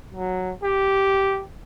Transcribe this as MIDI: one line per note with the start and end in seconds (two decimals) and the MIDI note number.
0.14 0.52 54
0.63 1.43 67